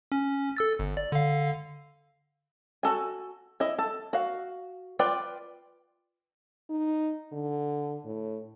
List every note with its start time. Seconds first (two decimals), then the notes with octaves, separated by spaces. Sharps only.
0.12 C#4
0.57 A4 E6 A6
0.79 G1
0.97 D5
1.12 D3 F5
2.83 F#4 A4 G#5
3.60 E4 D#5
3.78 A4
4.13 F#4 F5
4.99 F4 B4 D5 G5
6.70 D#4
7.33 D3
8.05 A2